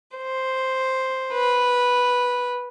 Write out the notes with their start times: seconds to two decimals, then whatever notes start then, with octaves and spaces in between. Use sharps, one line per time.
0.17 C5
1.32 B4